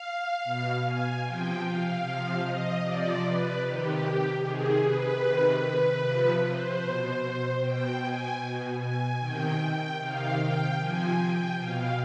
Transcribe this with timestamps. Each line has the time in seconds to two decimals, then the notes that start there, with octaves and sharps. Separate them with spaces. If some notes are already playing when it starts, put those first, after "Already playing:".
Already playing: F5
0.44 B2
0.84 G#5
1.23 C3 F3 G5
1.64 F5
2.04 C3 F3
2.43 D#5
2.82 C3 D5
2.87 F3
3.22 B4
3.62 C3 D#3 G4
4.42 C3 D#3 G#4
4.81 B4
5.22 C3 D#3
5.61 B4
6.01 C3 F3
6.41 C5
6.81 B2
7.60 B2 G5
8.00 G#5
8.40 B2
8.79 G#5
9.19 C3 D#3 G5
9.59 G5
9.99 C3 D#3 F5
10.39 G5
10.78 C3 F3 G#5
11.18 G5
11.59 B2 F5